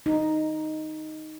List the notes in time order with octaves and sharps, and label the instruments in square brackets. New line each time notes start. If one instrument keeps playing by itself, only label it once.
[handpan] D#4